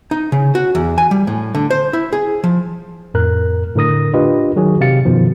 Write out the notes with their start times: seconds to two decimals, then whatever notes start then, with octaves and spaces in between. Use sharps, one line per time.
0.11 D#4
0.32 C#3
0.55 F#4
0.75 E2
0.98 G#5
1.11 G3
1.27 A2
1.55 D3
1.70 C5
1.93 E4
2.13 G#4
2.44 F3
3.14 F2 A2 A#4 F#6
3.76 A2 D3 A#4 D#6 A#6
4.13 D4 F4 G4 B4 D#5
4.56 D#3 F#3 F#4 G#4
4.81 C3 G4 F5 A6 C#7
5.05 F#2 B2 D#3 F3